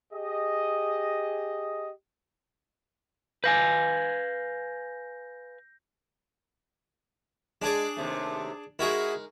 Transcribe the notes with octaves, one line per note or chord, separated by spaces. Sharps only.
G4 G#4 D#5
B4 F5 G#5 G6 A#6
G#3 D4 G#4 D5
D#2 C3 A3
G#3 D#4 E4 F#4 G#4 A#4